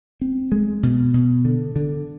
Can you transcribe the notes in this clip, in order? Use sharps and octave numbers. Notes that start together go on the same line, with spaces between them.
C4
G#3
B2
B2
D3
D3